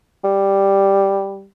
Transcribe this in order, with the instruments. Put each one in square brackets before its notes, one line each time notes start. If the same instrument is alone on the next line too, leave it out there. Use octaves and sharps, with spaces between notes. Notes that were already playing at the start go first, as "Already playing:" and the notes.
[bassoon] G3